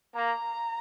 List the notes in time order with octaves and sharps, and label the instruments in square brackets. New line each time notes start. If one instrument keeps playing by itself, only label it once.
[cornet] A#3 [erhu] A#5